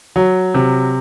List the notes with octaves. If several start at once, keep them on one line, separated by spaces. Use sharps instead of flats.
F#3
C3